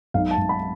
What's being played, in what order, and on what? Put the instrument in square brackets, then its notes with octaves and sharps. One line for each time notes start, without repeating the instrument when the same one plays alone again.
[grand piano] B1 F5
A5
B1
B5